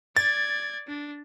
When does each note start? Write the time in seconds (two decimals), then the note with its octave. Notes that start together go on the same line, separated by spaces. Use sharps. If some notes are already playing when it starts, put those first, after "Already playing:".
0.17 D5 G#6 A6
0.88 D4